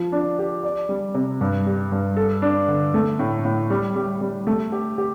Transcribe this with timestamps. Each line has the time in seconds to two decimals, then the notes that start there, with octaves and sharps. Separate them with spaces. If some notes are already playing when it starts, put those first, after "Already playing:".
Already playing: F3 F4
0.12 D4
0.39 G4
0.64 D5
0.89 G3
1.14 C3
1.41 G2
1.66 G3
1.92 G2
2.17 A4
2.42 D4
2.68 D3
2.94 A3
3.19 A2
3.45 A2
3.70 G3
3.96 G3
4.21 G3
4.47 A3
4.72 G4
4.98 G4